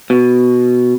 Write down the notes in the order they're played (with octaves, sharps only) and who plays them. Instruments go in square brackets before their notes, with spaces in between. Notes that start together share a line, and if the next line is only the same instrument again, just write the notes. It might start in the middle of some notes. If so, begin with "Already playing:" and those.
[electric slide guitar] B2